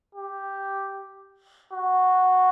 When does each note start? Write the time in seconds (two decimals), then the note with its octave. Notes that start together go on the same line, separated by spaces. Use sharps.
0.15 G4
1.72 F#4